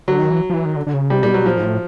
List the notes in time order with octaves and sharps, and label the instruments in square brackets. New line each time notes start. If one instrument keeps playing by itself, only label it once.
[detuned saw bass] D3 [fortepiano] F#3
[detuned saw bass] D#3
E3
F3
E3
D#3
D3
D3
C#3
[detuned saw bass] C3 [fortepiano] G3
[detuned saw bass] A#2 [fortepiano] G3
[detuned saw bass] B2
[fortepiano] F#3
[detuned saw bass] A#2 [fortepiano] F3
[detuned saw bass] G#2
A2